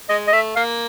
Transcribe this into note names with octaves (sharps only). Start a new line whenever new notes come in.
G#3 D#5
D#5
A3 E5
A#3 F5